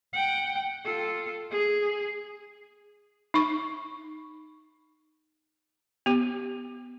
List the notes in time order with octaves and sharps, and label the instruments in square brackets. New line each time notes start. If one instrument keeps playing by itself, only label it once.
[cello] F#5 G5
F4 A4
G#4
[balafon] D#4 C#6
B3 G4